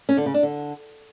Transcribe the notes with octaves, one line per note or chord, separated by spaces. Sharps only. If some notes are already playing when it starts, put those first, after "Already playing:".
C#4
D3
C#3
D4
D3